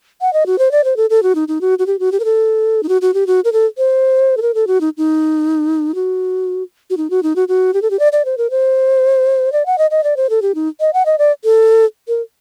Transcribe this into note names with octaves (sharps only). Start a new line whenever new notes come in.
F#5
D#5
F#4
C5
D5
C5
A4
A4
F#4
D#4
D#4
F#4
F#4
G4
F#4
G4
A#4
A4
D#4
F#4
F#4
G4
F#4
A#4
A4
C5
A4
A#4
A4
F#4
D#4
D#4
F#4
F#4
D#4
F#4
D#4
F#4
F#4
G4
A4
G4
D5
D5
C5
A#4
C5
D5
F#5
D#5
D#5
D5
C5
A4
G4
D#4
D#5
F#5
D#5
D5
A4
A#4